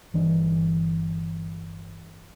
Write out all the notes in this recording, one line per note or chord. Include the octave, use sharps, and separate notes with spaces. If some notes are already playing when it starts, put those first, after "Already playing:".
G1 E3 D4